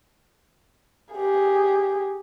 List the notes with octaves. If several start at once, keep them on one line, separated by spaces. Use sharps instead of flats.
G4 G#4